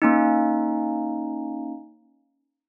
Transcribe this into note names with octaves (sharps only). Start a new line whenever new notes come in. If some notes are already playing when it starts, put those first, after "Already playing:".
A#3 C#4 D#4